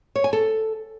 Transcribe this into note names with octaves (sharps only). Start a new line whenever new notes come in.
C#5
G#5
A4